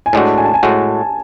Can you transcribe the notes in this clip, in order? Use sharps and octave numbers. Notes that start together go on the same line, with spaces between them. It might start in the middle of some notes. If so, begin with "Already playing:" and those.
G#5
A2 G#3 D4 F#4 A5
G#5
A5
G#5
A2 G#3 F#4